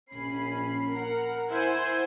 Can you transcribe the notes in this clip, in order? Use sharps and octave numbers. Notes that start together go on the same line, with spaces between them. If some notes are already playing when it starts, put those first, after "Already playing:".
A#1 C#4 B5 C7
A#4 F#5
E4 C5 F#5 G#5